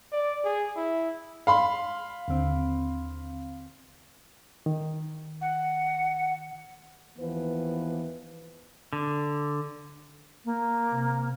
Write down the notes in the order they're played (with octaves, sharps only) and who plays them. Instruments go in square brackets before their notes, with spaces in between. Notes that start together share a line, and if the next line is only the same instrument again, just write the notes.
[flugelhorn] D5
G#4
E4
[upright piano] F5 B5 C6
[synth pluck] D#2 D3 C4
[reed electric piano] D#3
[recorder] F#5
[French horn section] D#2 E3 F3 B3 B4
[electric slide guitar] D3
[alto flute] A#3
[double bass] C3